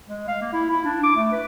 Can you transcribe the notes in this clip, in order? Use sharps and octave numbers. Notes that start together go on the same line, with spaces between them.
G#3
F5
A#3
E4
E4
D4
D6
A3
B4